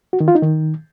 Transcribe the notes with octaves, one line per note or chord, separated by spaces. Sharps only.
F#4
D#3
F4
D#4
D#3